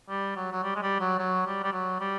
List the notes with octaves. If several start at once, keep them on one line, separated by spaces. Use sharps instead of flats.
G3
F#3
F#3
G3
G#3
G3
F#3
F#3
G3
G3
F#3
G3